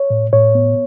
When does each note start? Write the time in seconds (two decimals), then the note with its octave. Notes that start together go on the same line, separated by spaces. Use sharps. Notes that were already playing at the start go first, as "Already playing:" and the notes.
Already playing: C#5
0.10 A2
0.33 A2 C#5
0.55 B3